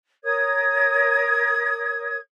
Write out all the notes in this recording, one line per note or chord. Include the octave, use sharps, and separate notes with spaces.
A#4 C#5 D#6 G#6